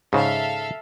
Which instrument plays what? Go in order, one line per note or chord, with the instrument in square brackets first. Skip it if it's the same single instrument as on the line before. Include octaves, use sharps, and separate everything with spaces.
[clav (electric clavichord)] G#2 C#3 [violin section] A4 E5 F5